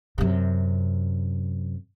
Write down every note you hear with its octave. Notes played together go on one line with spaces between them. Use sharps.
F#2 C3